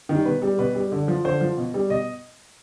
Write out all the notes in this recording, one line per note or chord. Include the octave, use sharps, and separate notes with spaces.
D#3 G3
B2 B4
G3
B2 B4
G3
D3
F3
D3 C5
F3
B2
G3
B2 D#5